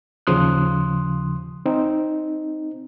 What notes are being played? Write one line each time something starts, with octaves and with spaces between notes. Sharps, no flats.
D#2 C#3 F3 C6 D#6 F#6
C4 D#4